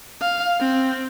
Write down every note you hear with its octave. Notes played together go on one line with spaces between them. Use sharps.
F5
C4